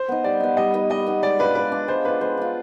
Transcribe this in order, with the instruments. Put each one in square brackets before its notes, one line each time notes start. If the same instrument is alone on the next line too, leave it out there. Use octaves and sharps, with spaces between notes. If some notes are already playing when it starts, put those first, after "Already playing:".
Already playing: [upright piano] C5
[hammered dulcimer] B3 D#4
[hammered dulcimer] G3 [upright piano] D5
[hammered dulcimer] B3 D#4
[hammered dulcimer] G3 [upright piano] D#5
[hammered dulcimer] B3 D#4
[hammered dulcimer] G3 [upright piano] D#5
[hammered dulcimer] B3 D#4
[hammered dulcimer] G#3 [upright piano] D5
[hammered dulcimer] D4 F4 [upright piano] B4
[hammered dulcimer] G#3 [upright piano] B4
[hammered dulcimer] D4 F4
[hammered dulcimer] G#3 [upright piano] C5
[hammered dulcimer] D4 F4 [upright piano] B4
[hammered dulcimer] G#3 [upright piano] C5
[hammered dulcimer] D4 F4